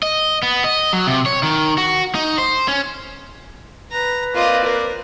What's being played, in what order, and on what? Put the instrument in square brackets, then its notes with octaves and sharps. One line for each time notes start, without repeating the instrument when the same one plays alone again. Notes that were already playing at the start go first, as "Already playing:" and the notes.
[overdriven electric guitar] D#5
B3
D#5
F#3
C3
C#5
D#3
F#4
D#4
C5
C#4
[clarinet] B4 [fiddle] A#5
[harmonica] A#3 C4 D5 [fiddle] F4 D#5
[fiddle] A#4